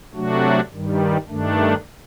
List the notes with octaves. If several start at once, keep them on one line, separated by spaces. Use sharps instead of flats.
C3 F#3 A3 D4 F#4
G2 D#3 G3
G2 D#3 A3 D4